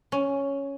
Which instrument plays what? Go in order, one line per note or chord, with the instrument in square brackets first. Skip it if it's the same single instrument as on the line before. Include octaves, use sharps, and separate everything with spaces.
[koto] C#4